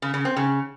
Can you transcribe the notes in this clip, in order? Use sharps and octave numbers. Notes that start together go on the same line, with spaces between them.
C#3
C#3
C4
C#3